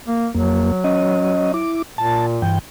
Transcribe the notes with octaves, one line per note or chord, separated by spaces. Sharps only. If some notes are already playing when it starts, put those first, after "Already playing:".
A#3
F2 F#3 A#3
C#4 D#5
E4 D6
A#2 A5
G2 E3 G5